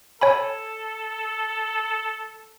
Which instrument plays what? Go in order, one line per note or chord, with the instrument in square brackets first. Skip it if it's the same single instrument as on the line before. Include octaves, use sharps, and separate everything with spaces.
[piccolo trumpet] A4 [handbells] C#5 G#5 B5